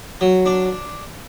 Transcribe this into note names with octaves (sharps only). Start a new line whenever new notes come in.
F#3
D4